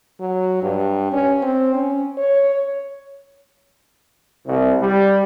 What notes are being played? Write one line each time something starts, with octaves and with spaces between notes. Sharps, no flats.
F#3
G2
C#4
C4
C#4
C#5
C2
G3